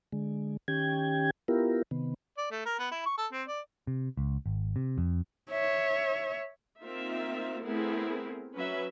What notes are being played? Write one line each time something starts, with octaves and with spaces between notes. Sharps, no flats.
D3 G#3
D#3 C#4 G4 G5 G#6
B3 E4 F4 G4 A#4
C3 D#3 B3
D5
A3
A#4
B3
E4
C#6
A4
C4
D5
C3
C#2
G#1
C3
F2
C#5 E5
A#3 C4 D#4 F4 E5
A3 B3 C4 E4 G#4 A#4
F#3 C#4 B4 E5